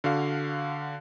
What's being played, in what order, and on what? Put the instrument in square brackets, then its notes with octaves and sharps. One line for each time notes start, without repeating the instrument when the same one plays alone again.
[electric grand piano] D3 F#4 F5